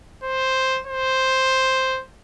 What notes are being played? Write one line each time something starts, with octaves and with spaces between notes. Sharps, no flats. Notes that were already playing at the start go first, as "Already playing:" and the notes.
C5
C5